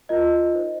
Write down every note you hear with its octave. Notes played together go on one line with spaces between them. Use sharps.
F4 A#4 D#5
D#4 C5